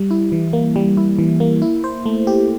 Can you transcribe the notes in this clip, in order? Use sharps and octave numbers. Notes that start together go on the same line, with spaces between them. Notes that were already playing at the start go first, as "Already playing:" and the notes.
Already playing: G3
E4
E3
A#3
G3
E4
E3
A#3
E4
C5
A3
G4